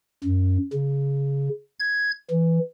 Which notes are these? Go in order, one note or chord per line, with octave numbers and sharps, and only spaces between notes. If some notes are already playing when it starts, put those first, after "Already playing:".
F#2
C#3
G#6
E3